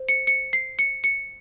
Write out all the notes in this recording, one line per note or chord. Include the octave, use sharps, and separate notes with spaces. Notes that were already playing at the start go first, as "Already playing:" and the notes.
Already playing: C5
C#7
C#7
C7
C#7
C#7